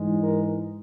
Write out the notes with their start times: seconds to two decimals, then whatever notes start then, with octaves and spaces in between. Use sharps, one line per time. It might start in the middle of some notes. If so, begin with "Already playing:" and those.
Already playing: G#2 E3 G#3
0.23 A#4